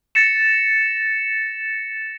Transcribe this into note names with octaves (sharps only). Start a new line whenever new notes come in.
A6 A#6 C#7 E7